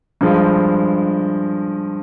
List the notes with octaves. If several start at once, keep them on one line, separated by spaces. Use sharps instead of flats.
G2 F3 G#3